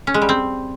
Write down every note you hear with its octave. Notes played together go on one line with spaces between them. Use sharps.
C#4
G#3
G3
C4